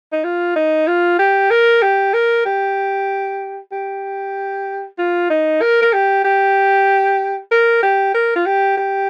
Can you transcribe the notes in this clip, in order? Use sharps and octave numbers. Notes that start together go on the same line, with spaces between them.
D#4
F4
D#4
F4
G4
A#4
G4
A#4
G4
G4
F4
D#4
A#4
A#4
G4
G4
A#4
G4
A#4
F4
G4
G4